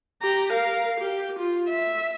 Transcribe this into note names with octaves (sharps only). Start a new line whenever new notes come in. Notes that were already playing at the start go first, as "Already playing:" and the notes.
G4 A#5
A#4 F5
G4
F4
E5